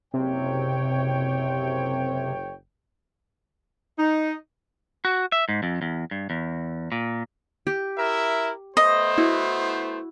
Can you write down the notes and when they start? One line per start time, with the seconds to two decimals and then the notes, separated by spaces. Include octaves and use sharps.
0.14 F#1 C3 C#5 G5
3.98 D#4
5.05 F#4
5.32 E5
5.49 G#2
5.63 F2
5.82 E2
6.11 G2
6.30 E2
6.92 A#2
7.67 G4
7.97 E4 A#4 E5
8.77 A3 B3 C5 D#5
9.18 E4 F#4